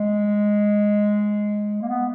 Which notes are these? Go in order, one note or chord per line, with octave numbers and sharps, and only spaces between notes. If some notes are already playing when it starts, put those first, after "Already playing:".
Already playing: G#3
A#3
B3